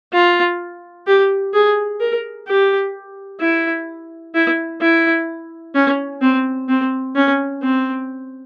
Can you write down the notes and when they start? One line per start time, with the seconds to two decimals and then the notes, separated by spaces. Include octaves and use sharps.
0.13 F4
1.07 G4
1.54 G#4
2.00 A#4
2.47 G4
3.41 E4
4.34 E4
4.81 E4
5.75 C#4
6.21 C4
6.69 C4
7.15 C#4
7.62 C4